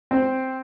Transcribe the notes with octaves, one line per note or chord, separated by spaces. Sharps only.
C4